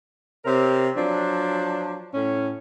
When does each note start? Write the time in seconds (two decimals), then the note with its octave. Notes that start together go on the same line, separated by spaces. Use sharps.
0.45 C3 C4 G4 A#4 C#5
0.96 F3 F#3 D4
2.13 A2 C#4